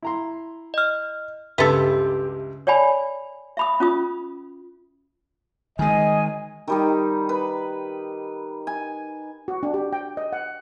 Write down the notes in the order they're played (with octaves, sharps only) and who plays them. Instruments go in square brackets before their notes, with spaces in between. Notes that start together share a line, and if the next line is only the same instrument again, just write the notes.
[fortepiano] E4 A#5 C6
[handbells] D#5 F6
[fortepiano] C#2 G2 [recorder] G4 [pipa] A4 B4 [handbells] E5 C6 E6
[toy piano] C#5 D5 G5 G#5 B5
E5 B5 D#6
C#4 F4 D#6
[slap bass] D#3 G#3 [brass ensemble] D#5 [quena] G#5
[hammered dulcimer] D#3 G3 D#4
B4
G#5
[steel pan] F#4
D4
G4
G5
D#5
F#5